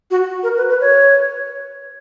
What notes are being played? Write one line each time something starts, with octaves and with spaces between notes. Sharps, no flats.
F#4
A#4
B4
B4
C#5